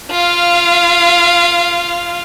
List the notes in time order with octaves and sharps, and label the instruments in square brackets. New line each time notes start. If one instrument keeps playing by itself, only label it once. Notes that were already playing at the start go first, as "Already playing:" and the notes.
[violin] F4 F5